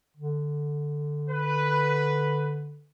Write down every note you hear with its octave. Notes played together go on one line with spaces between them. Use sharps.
D3
B4